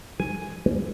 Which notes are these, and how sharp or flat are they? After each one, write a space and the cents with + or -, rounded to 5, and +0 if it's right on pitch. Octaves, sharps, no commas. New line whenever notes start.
G#5 +5